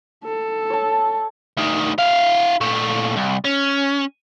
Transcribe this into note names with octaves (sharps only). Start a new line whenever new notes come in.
A4
C#5 A5
D2 D#3
E4 F5
A#2 A3
C2
C#4